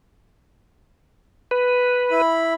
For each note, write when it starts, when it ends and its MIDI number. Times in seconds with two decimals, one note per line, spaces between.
1.51 2.21 71
2.11 2.54 64
2.11 2.54 83